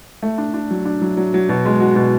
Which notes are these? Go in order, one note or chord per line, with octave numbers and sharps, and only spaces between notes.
A3
D4
D4
F#3
D4
F#3
F#3
F#3
B2
G#3
F#4
B2